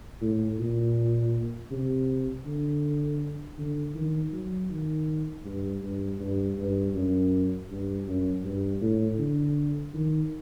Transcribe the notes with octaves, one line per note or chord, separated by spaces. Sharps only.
A2
A#2
C3
D3
D3
D#3
F#3
D#3
G2
G2
G2
G2
F#2
G2
F#2
G2
A2
D3
D#3